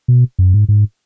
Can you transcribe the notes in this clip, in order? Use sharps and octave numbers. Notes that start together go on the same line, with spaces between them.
B2
F#2
G#2
G#2